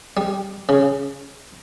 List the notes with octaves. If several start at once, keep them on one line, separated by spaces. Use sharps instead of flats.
G3
C#3